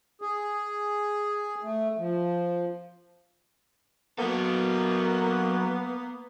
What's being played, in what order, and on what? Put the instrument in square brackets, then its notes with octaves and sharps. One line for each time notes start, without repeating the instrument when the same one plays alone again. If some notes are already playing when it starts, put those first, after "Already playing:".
[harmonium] G#4
A3
F3
[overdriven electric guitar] F#3 A4 [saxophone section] A#3 B3